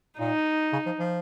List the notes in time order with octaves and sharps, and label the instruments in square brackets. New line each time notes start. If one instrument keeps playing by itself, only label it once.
[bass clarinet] A#2 [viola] D#4
[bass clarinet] C#3
F3
F3